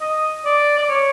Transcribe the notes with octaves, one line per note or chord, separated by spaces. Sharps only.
D#5
D5
D5
C#5